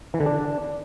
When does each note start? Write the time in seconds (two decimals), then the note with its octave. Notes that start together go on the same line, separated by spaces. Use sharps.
0.14 E3
0.20 D3
0.26 D4